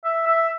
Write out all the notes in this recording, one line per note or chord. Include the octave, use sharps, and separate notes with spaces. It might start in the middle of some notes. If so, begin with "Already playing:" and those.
E5
E5